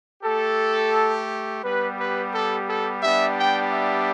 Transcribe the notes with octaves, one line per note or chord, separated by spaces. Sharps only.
A3 G4 A4
G3 B3 G4 B4
B4
A4
A4
G3 B3 D4 G4 E5
G5
E5